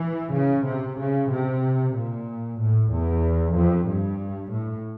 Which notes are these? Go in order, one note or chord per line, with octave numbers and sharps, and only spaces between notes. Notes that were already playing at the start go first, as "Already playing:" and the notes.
Already playing: E3
C#3
C3
C#3
C3
A#2
A2
E2
F2
G2
A2